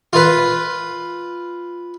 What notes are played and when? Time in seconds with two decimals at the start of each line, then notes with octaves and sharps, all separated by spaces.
0.13 F4 B4